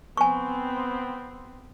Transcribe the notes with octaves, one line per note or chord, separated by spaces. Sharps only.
B3 C4 G#5 C#6